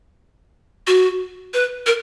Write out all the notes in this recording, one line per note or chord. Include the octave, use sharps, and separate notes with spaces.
F#4
B4
A#4